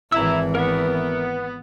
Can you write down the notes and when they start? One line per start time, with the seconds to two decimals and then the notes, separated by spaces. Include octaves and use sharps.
0.12 G#1 E3 E4 A#5 E6
0.55 B3 A#4 E5